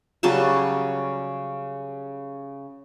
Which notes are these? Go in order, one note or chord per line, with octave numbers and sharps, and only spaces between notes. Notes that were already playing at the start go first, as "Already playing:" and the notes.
C#3 F#3 G3 A5